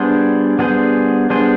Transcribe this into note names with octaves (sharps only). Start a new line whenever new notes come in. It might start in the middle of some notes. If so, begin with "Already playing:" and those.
Already playing: G3 B3 D4 G#4 C5
G3 B3 D4 G#4 C5
G3 B3 D4 G#4 C5